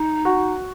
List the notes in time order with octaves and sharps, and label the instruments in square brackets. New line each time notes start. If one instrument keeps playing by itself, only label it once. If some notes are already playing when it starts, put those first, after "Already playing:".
Already playing: [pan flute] D#4
[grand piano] F#4